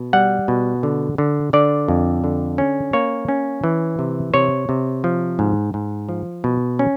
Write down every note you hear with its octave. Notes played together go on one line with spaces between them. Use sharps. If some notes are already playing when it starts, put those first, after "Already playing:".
Already playing: B2
G3 F#5
B2
D3
D3
D3 D5
F2
D3
C#4
A#3 C#5
C#4
E3
C3
C3 C#5
C3
F3
G#2
G#2
F3
B2
C#4